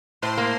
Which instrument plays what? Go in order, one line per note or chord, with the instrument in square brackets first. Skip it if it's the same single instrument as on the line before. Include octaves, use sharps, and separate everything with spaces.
[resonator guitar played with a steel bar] A2 [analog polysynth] C5 C6
[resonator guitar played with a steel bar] A#3